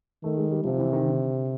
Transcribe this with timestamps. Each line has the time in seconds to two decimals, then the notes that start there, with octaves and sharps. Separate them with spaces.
0.23 D#3 A3
0.37 G#3
0.52 G3
0.64 C3 F3
0.78 E3
0.93 D#3
1.07 D3